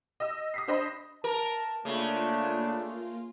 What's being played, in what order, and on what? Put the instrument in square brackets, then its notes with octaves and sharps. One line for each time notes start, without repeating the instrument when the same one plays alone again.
[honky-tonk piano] D#5 E6
D#6 B6 C7
D4 C5 D#5 B5
[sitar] A#4 [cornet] A5
[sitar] C#3 [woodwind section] A3 [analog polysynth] A#3 F4 [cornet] D4